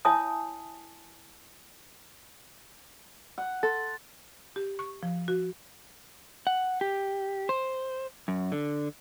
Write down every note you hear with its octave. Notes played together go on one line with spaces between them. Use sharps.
E4 C#5 E5 G#5 A5 D#6
F#5
A4 C6 A6
G4
C#6
F3
F#4
F#5
G4
C5
F#2
D3